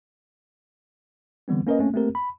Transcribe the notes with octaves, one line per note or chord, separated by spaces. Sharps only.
D3 E3 G3 B3 C4
A#3 C#4 A#4 B4 D#5
A3 A#3 C4 C#4
A3 A#3 C4 G4 A#4
B5